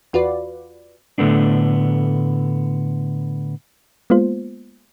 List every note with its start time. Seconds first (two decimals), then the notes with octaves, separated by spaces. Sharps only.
0.13 E2 F4 F#4 B4 D5
1.18 A2 D3 A3 B3 D4
4.10 G#3 A#3 B3 F4 C5